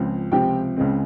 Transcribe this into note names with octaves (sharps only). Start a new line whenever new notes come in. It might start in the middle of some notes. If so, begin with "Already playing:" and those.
Already playing: C#2 C#3 F3 C4
C#2 C3 F3 C4 G4 G5
C#2 C#3 G#3 C4